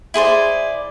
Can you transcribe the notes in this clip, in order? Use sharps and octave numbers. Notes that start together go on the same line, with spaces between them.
E4 G#4 C5 D5